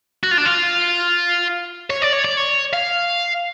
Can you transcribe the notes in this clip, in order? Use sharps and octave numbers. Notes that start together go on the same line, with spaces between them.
F#4
F4
D4
F4
C#5
D5
C#5
D5
C#5
F5